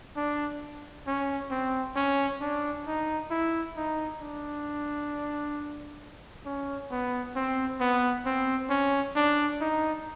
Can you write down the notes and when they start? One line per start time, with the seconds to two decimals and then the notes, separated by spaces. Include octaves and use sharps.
0.17 D4
1.07 C#4
1.51 C4
1.96 C#4
2.41 D4
2.87 D#4
3.31 E4
3.76 D#4
4.21 D4
6.46 C#4
6.91 B3
7.36 C4
7.81 B3
8.26 C4
8.70 C#4
9.16 D4
9.61 D#4